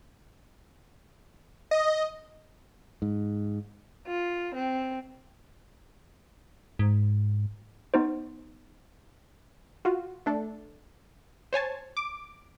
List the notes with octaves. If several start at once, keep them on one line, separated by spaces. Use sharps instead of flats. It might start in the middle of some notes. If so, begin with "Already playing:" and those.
D#5
G#2
F4
C4
G#2
B3 D#4 C5
F4 F#4
A3 D4 A4
C5 C#5 G#5 A5
D6